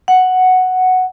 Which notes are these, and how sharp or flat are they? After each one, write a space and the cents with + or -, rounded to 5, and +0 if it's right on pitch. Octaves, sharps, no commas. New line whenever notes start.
F#5 +0